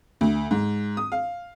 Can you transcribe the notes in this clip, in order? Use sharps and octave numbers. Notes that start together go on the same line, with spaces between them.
D2
G#2
D#6
F5